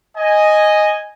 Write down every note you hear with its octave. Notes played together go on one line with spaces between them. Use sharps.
D#5 G#5